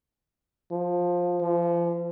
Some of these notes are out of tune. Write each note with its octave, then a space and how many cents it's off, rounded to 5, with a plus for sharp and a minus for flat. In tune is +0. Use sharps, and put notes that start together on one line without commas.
F3 +15
F3 -30